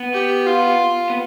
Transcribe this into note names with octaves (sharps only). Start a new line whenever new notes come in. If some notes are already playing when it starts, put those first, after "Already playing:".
Already playing: B3
G4
F4
B3